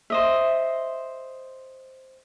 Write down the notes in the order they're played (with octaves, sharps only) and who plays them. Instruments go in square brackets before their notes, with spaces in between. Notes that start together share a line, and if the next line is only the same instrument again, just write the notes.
[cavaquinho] C5 D#5 E5